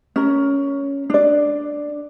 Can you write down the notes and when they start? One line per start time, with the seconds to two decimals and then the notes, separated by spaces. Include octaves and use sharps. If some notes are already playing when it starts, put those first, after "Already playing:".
0.16 C#4 A#4
1.10 D4 D5